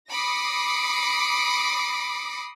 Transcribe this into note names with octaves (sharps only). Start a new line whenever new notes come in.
B5 D6 D#6 A#6 C7 C#7